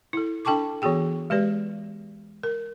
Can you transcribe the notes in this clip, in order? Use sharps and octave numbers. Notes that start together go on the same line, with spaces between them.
E4 A4
D4 A4 G5 A5 C#6 D6
E3 B3 F#4 G#4 G5
G#3 G4 B4 D5
A#4